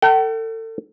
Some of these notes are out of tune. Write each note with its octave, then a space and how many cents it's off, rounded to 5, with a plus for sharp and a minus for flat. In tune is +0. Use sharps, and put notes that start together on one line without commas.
A4 +35 G5 -45